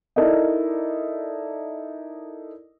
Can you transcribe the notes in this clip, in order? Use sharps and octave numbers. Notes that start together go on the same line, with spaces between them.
D#4 E4 A4 A#4 D5 D#5